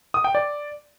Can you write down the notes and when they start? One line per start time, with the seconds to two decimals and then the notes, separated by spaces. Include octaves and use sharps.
0.14 D#6
0.24 G5
0.35 D5